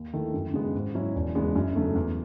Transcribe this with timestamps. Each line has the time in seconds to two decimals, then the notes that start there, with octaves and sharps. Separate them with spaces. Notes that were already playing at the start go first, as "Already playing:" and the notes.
Already playing: D#2
0.13 D#3 A3 E4
0.34 F#2
0.54 C#3 G#3 B3
0.74 G#2
0.95 F#3 C#4 E4
1.15 E1
1.35 E2 C#3 G#3 B3
1.55 F#2
1.76 C#3 F#3 A3
1.95 E2